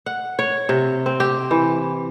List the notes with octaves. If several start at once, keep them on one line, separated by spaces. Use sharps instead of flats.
F#5
C#5
C3
C4
G4
E3